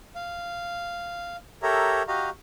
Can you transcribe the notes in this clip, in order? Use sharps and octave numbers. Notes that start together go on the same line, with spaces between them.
F5
G4 A4 A#4 C#5 E5 A#5
F#4 G4 D#5 F5 A#5